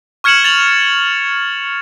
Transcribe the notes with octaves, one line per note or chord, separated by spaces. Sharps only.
C#6 F6 G#6 C#7 E7 F#7
A6 F7 F#7